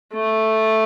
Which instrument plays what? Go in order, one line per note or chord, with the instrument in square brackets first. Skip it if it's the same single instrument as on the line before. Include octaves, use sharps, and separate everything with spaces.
[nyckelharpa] A3